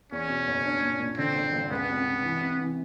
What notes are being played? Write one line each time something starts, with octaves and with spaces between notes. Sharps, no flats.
E2 C#4
B2
F#1
D4
A#2
A#2
D3 C4
G1
G1
C#2 B3
C3
C3
E3
C3
E3